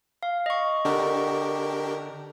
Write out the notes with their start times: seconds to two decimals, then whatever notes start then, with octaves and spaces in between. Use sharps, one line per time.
0.23 F5
0.46 D#5 C#6
0.85 D3 D4 G4 A#4